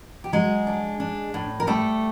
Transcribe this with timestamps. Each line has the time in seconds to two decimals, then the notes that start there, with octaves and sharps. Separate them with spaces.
0.24 G4
0.32 F#3 G#3 G#4
0.67 D4
1.00 D4
1.34 A2
1.60 A#4
1.67 G3 A3 A4